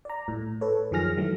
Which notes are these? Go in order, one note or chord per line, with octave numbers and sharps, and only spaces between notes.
D5 A#5
A2
A4 B4 C#5
F#2 D#3 F3 G#4 F6 A#6
D#3 E3 F#3 A3